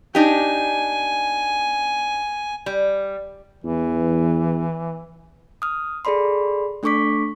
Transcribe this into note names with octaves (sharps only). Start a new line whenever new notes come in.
D4 D#4 G4 G#5
G3
E2 E3
D#6 F6
G#4 A4 D5 B5 C6
A3 D4 A4 C#6 D6 B6